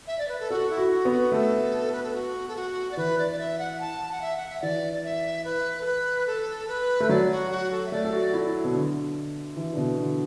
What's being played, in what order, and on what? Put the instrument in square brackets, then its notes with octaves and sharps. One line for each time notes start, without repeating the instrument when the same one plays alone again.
[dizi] E5
D5
B4
A4
[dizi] F#4 [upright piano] A4
[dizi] E4
[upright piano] F#4
[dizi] F#4
[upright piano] B3
[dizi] F#4
[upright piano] A3 [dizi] A4
[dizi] B4
A4
F#4
A4
F#4
D5
[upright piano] E3 [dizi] B4
[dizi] D5
D5
E5
F#5
A5
F#5
E5
F#5
E5
[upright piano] E3 [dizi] D5
[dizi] D5
E5
B4
A4
B4
A4
B4
[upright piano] A3
[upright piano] F#3 [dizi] D5
[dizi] F#4
F#4
A4
E5
[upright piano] A3 [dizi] D5
[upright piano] A4
F#4
E4
B2
D3
E3
D3
B2
D3